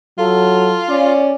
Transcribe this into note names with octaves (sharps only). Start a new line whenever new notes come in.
F#3 F4 A4
C#4 D5